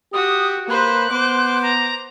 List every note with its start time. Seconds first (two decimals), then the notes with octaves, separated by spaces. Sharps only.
0.13 F#4 G4 D#6
0.68 A#3 B4 C5 F#6
1.11 B3 C5 D6
1.62 A#5